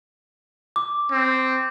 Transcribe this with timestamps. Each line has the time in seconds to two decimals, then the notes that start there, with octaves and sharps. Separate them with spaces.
0.76 D6
1.12 C4